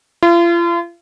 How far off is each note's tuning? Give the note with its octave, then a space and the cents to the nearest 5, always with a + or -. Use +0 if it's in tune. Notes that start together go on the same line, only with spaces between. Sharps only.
F4 -40